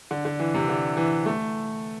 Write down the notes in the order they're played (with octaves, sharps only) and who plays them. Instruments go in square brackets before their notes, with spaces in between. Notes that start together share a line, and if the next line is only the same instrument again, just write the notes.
[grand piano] D3
D3
E3
C3
D3
E3
A3